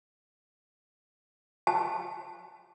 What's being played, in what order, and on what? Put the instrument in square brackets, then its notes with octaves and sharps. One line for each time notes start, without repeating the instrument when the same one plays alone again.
[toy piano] A5